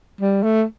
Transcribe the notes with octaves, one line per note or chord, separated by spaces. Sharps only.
G3
A3